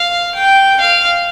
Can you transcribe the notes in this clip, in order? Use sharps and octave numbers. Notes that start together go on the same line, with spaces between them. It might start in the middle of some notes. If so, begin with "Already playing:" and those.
Already playing: F5
G5
F5